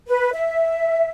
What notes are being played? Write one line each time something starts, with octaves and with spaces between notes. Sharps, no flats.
B4
E5